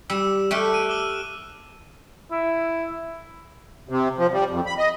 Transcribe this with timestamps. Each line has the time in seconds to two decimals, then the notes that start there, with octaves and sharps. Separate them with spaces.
0.10 G3 E6 E7
0.51 A3 G4 F6 F#6 D7
0.74 D#7
0.89 D6 E6 G7
2.31 E4
3.89 C3
4.18 F3
4.32 G3
4.50 F2
4.66 B5
4.78 D#5